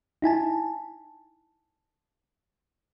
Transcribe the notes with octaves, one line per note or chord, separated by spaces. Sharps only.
D#4 E4 G#5 A5